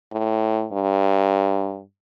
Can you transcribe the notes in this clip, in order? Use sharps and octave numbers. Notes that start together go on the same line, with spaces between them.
A2
G2